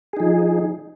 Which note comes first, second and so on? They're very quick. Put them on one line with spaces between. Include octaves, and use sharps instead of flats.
G#4 D#4 F3